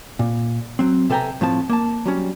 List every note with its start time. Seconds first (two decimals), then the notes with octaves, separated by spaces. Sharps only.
0.19 A#2
0.79 F#3 C4
1.10 C3 A4 B4 G5 G#5 A#5
1.41 A2 F3 C4 A5
1.69 A#3 A5
2.05 F#3 G3 C#4